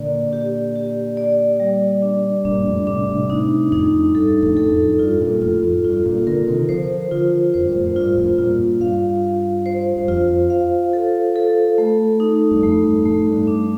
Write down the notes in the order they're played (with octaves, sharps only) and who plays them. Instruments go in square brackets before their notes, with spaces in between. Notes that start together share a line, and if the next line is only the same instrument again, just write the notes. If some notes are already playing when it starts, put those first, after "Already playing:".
Already playing: [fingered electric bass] A#2 D3 [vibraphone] D5
[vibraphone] G4
G4
D5
G3
D4
[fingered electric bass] G2 A#2 [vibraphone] D4
[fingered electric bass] F2 A2
[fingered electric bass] A2 C3 [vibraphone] D4
[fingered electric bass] A2 C3
[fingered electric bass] A2 C3 [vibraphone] D#4
[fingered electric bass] F2 A2 [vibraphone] D#4
[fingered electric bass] G2 [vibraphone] A4
[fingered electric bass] F2 A2
[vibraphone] A4
[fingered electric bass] F2
[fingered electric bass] G2 [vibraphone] F4
[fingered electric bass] G2 A#2
[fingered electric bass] F2 A2 [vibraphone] F4
[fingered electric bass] F2
[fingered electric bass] G2 [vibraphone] F4
[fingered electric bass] G2 A#2
C3
[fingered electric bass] A#2 D3 [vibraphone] A#4
[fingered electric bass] C3 D#3
[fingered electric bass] D3 F3 [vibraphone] C5
[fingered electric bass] D3 F3 [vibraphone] F4
[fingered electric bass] F2 [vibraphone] C5
[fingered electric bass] G2
F2 A2
[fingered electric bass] G2 [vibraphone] F4
[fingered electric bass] F2 A2
[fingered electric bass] G2 A#2 [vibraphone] F4
[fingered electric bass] G2 [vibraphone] F5
[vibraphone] F5
C5
[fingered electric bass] G2
[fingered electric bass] F2 [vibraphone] F4
[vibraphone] F5
A4
A4
A3
D#4
[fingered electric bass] G2
[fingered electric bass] F2 [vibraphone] A3
[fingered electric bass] G2
[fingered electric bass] F2 A2 [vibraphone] A3
[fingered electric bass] G2
[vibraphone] D4